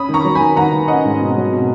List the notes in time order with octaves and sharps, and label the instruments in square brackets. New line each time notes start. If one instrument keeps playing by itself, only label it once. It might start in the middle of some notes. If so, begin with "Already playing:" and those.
Already playing: [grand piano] C#4 [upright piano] B5 D#6
[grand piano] D#3
[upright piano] A#5 C#6
[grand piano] F#3
[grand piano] D#3 [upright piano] G#5 B5
[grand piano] D#3 [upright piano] F#5 A#5
[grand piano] D#3
[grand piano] C#4 [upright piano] D#5 F#5
[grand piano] G#2
B2
F#3
B2